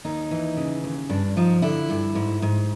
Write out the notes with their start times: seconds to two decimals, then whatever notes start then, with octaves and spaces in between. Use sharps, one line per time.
0.05 D#2 D#4
0.31 E3
0.57 C#3
0.84 D#2
1.09 G2 D4
1.37 F3 D#4
1.62 D3 E4
1.90 G2
2.15 G#2
2.42 G#2